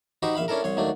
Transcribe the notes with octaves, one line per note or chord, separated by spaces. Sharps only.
D#4 F#4 G4 C5 B5 C#6
A#1 E5 F5 B5
C#4 D4 E4 A4 A#4
C2 C#5 C6
D#2 F#3 A3 D4